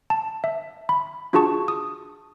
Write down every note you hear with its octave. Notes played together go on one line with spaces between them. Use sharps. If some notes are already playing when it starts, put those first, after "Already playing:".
A5
E5
B5
D4 F4 F#4 G#4 A5 C#6
D#6